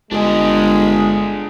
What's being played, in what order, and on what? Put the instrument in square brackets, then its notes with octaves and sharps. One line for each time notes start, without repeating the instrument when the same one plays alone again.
[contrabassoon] G1 [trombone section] G#3 [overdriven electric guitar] D4 G#4